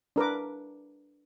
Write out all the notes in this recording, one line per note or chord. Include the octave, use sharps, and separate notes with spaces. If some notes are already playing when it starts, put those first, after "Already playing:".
D4 A#4 B4 D6